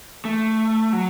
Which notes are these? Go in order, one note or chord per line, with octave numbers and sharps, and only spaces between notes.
A3
F#3